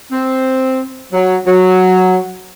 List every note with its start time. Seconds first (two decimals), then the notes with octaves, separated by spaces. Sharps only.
0.12 C4
1.13 F#3
1.46 F#3